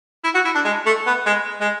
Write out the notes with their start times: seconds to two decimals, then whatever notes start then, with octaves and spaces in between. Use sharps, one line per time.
0.24 E4
0.35 F#4
0.45 E4
0.54 D4
0.65 G#3
0.86 A3
1.06 B3
1.26 G#3
1.61 G#3